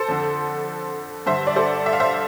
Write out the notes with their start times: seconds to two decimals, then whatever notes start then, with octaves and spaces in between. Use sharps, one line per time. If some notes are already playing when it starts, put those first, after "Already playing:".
Already playing: A4 C5
0.08 F2 D3
1.26 G2 D3 C5 E5
1.47 D5
1.56 A4 C5
1.86 E5
1.93 F5
2.00 C5 E5